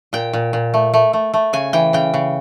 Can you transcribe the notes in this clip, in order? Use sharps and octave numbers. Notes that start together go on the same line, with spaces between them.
A#2 G5
A#2
A#2
A3
A3
A3
A3
C#3 G#5
E3 G5
C#3 G5
C#3